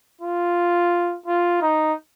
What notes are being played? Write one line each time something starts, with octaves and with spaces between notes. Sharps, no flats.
F4
F4
D#4